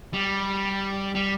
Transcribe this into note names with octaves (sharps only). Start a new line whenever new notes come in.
G3
G3